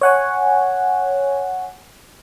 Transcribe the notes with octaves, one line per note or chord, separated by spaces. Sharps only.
C#5 F#5 G#5